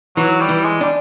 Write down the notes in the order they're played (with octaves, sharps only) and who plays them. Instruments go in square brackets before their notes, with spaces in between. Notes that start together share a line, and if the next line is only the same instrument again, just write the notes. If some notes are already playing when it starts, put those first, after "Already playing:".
[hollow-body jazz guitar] E3 [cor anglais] F#3
[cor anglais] G3
[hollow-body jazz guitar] E3
[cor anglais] G#3
[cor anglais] G3 [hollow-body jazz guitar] D4